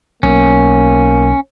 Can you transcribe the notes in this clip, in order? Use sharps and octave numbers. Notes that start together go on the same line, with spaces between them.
B1 A#3 C#4